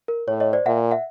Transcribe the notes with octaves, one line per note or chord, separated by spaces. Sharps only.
A#4
A2 C#5
C#5 D#5
C5 D5
A#2 E5 F#5
E5 F#5